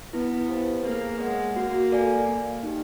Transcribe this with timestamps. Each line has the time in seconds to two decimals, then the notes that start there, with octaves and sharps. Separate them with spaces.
0.13 B3 E4
0.49 G4 C5 F5 A5
0.84 A#3 G#4
1.20 G#3 C#5 F#5
1.56 A#3 F#4
1.91 A4 D5 F5 G#5
2.27 A#3
2.63 D#4 G4